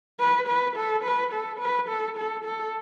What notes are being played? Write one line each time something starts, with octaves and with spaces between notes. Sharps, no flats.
B4
B4
A4
B4
A4
B4
A4
A4
A4